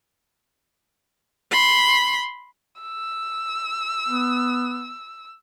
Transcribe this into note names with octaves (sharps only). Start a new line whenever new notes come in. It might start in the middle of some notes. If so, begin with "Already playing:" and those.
B5 C6
E6
B3